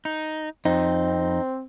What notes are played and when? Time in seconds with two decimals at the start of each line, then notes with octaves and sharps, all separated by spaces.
0.05 D#4
0.65 F2 C4 D#4